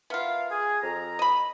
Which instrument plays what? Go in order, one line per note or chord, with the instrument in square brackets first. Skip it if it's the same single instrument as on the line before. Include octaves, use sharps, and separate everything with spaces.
[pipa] B3 F4 [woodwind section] A#4 E5 F5
[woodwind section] G#4
F2 A#5
[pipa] D#5 B5